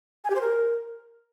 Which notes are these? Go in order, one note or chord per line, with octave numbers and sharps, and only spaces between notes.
G#5
G4
C5
A#4